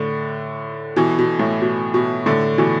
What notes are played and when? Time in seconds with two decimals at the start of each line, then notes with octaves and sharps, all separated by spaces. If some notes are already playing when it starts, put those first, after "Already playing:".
Already playing: A2 D3
0.96 B2 E3
1.19 B2
1.39 A2
1.62 B2
1.94 B2
2.26 A2 D3
2.58 B2 E3